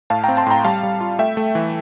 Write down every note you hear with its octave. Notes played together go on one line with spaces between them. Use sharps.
A2 F5 A5
G5 A#5
C4
A5 C6
A2 G5 A#5
G3 F5 A5
G3
F4
A3 E5 G5
A3
E3